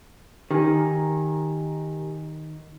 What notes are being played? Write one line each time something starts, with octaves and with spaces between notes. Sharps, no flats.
D#3 G4 A#4 G#5